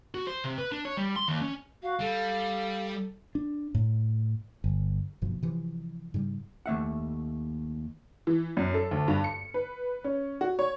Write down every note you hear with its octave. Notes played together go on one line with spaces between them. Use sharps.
F#4
C5
C3
B4
D4
C#5
G3
C6
D#2
C#4
F#4 F5
G3 A4
D4
A2
G1
F#1 G2 B2 F3
C3 E3 F3
G#2 C#3 G3
D#2 A3 E5 F#5
E3
F#2
A4
D2
G2
C#7
B4
C#4
F#4
C#5